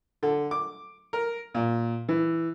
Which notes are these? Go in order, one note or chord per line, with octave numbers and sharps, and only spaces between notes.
D3
D6
A#4
A#2
E3